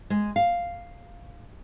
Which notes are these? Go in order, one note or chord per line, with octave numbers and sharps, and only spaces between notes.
G#3
F5